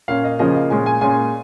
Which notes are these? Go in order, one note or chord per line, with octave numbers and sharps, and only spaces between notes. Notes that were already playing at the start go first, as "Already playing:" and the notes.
A#2 A#3 C#4 F5
D#5
C#3 F3 A#3 C#4 D#5
F5
A#2 G#3 C#4 G#5
G#5
A#2 G#3 C#4 G#5